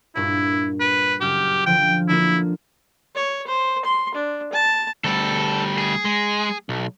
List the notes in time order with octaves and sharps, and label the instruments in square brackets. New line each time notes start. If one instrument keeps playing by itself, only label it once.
[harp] G2 A#2 [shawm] E4
[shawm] B4
[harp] F#1 F6 G6 [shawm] G4
[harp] D3 F3 [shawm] G5
[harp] D3 A#3 F4 [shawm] E4
[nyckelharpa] C#5
C5
C6
D4
A5
[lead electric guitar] D2 G3 [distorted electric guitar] A4
[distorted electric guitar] G#4
[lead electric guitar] G#3
B1